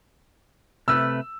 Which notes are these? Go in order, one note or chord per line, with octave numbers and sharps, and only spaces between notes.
C3 A3 B4 E6